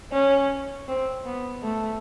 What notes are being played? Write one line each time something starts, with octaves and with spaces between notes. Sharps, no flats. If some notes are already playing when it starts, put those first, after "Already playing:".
C#4
C4
B3
A3